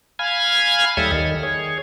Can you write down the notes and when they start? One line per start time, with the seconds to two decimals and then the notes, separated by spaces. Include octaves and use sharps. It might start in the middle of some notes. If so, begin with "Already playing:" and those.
0.19 F5 G#5 B5 F6 G#6
0.97 D#2 G3 A4 C#5 E5 D#6
1.12 D#3
1.43 G#4 C#5